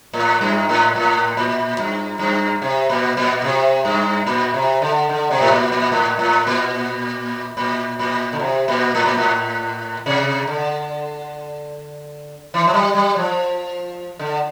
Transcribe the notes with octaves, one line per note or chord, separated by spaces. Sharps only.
A2
G2
A2
A2
A#2
G2
G2
C3
A#2
A#2
C3
G2
A#2
C3
D3
D3
C3
A2
A#2
A#2
A2
A2
A#2
A#2
A#2
D3
C3
A#2
A2
A#2
A2
C3
D3
E3
F3
G3
G3
F3
D3